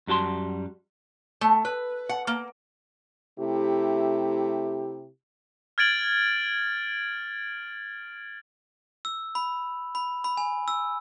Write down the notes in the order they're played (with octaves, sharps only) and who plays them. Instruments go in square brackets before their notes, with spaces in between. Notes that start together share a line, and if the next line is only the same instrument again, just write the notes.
[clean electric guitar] F#2 G3 F#4 A5 C6
[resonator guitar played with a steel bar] A3
B4
F#5
A#3
[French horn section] C3 A3 E4 G4
[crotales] F6 G#6 A6 D7 F#7
[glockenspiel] E6
B5
B5
B5
G#5
E6